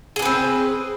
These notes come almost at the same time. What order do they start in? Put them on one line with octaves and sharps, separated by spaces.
G#4 D4 B4 C4